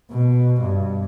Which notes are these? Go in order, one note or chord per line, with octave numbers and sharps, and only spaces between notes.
B2
G2